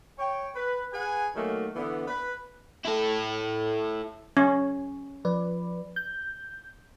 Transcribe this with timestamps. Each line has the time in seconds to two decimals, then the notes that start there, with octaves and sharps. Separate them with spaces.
0.19 C#5 G5
0.55 B4
0.93 G#4 B4 F#5 G#5
1.34 D#3 F#3 A3 A#3 D#4
1.75 D3 E3 B3
2.08 B4
2.85 E4 A4
4.37 C#4
5.25 F3 B4 D5
5.96 G6